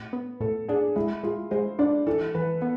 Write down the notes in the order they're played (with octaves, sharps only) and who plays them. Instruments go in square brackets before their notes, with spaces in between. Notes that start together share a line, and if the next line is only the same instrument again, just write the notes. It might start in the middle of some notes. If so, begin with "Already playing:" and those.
Already playing: [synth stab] A2
B3
[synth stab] A2 [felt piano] A4
[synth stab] D4 [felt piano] G#4
[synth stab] G#3 [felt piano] E4
[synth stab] G#3 [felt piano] F4
[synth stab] G#3 [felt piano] C5
[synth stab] D4 [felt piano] D5
[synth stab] E3 [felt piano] A4
[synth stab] E3 [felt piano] B4
[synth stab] B3